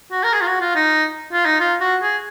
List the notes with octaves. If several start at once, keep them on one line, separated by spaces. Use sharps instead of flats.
F#4
A#4
G#4
F4
F#4
F4
D#4
F4
D#4
F4
F#4
G#4